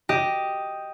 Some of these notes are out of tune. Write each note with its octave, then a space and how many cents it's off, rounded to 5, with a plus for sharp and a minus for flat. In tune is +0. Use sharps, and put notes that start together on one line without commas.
G4 +0 D#5 +5